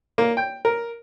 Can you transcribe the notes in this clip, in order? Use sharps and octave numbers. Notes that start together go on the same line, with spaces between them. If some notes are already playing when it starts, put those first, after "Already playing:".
A#3
G5
A#4